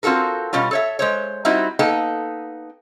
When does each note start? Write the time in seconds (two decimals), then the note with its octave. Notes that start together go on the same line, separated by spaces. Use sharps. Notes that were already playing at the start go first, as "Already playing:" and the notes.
0.03 C4 F4 F#4 A4 A#4
0.53 B2 G3 C#4 F4
0.71 A4 C#5 E5
0.99 G#3 C5 C#5
1.45 G3 C4 D#4 E4 F#4
1.79 A#3 B3 D#4 A4 G5